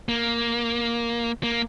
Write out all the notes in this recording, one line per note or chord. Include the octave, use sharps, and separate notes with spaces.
A#3
A#3